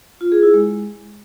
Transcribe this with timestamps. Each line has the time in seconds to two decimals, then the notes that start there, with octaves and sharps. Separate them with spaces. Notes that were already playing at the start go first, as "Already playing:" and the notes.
0.21 F4
0.32 G#4
0.43 E4
0.54 G#3